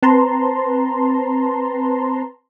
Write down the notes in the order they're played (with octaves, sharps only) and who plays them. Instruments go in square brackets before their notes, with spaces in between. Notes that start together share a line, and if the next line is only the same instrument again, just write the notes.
[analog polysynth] C4 B4 A5 A#5 C6